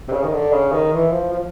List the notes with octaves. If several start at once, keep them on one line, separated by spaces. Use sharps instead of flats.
C3
C#3
D#3
D3
C#3
D#3
E3
F3
F3